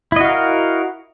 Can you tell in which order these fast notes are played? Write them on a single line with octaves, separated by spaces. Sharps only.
E4 D#5 F#4 F5 A#4